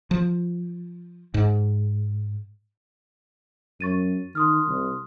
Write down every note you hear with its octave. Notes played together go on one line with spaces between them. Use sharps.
F3
G#2
F#2 C#6 A6 D#7
D#3 C6 D#6 F6
C2